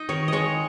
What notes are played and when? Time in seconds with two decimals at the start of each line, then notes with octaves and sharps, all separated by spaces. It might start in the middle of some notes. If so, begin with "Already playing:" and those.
Already playing: D#4 D#5
0.09 D#3 C#5
0.28 G#3 C#5 D#5